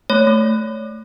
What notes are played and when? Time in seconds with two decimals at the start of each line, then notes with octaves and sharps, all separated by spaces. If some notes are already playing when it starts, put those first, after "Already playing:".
0.10 A3 C#5
0.27 A3